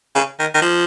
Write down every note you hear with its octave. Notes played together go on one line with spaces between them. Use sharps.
C#3
D#3
D#3
F3